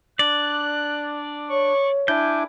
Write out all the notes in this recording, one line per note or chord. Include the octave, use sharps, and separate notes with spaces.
D4 D5 F#6
C#5 C#6
D4 E4 G#5 D6 G6